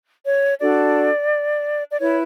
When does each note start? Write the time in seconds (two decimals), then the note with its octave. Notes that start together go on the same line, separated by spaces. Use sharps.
0.24 C#5
0.59 D4 F#4 A4 D5
1.91 D5
1.99 E4 B4 C#5